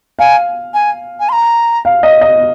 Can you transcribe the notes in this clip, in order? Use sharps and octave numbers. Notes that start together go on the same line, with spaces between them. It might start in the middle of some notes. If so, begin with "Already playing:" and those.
F5 G#5
G#5
G#5
C6
A#5
F5
D#5
D#5